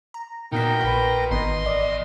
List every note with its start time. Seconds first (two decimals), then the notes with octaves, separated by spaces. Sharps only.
0.14 A#5
0.52 A#2 B3 D#4 F#4 A#4 G5 B6
0.80 A#1 A#2 F#4 B4 C6
1.30 G#1 E2 D#3 B3 D#5 C6
1.66 D5